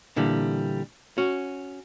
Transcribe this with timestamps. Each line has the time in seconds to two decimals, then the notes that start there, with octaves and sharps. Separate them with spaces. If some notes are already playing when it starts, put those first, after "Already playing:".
0.16 A#2 D3 E3 G3
1.18 C#4 F#4